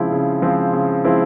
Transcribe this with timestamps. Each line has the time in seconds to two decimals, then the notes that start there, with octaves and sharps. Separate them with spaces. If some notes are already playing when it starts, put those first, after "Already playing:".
Already playing: C#3 F3 G#3 C4 E4
0.12 C#3
0.42 F3 G#3 C4 E4
0.73 C#3
1.04 F3 G#3 C4 E4